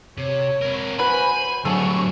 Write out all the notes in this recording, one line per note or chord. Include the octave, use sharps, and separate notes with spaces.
C3 C#5
C4 A#4
F#3 B4 C5 G#5 B5
D2 G2 F#3 G#4 A4 C#6